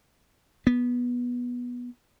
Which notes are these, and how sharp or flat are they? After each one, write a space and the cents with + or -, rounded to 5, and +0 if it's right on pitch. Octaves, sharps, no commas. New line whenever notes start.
B3 -15